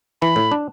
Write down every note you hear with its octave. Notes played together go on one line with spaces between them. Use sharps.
E3 B5
A2
D4